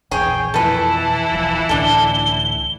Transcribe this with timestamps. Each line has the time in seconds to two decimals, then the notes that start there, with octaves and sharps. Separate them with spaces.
0.11 A#1 E2 G#4 C#5 G5
0.54 F2 B2 E3 F3 E4 A4 B4 A5
1.31 D#1 B1 F3
1.69 C#2 A2 D3 D4 A4 G7